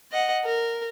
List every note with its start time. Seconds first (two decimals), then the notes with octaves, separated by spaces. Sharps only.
0.12 D#5 F#5
0.45 A#4